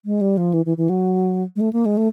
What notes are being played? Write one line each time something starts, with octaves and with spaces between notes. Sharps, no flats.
G#3
G3
F3
E3
E3
E3
F#3
G#3
A3
A#3
G#3
A3